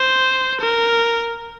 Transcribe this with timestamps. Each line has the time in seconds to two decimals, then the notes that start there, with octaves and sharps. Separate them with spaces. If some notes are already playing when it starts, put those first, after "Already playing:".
Already playing: C5
0.61 A#4